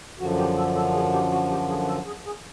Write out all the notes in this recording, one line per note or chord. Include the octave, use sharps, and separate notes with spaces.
F#2 D3 F3 F#4
G4
A4
A4
G#4
G4
F#4
G4
G#4
A4
G#4
G#4